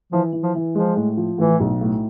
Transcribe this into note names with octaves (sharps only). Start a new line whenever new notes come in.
E3 F3
E3
F3
E3
F3 G#3
A2
F3
A2 E3
B1
A2